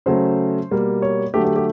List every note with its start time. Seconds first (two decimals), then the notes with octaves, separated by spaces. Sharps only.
0.06 C#3 F#3 A3 C5
0.71 B2 G3 A#3
1.02 C#5
1.34 D3 F#3 A3 G4
1.45 G4
1.56 G4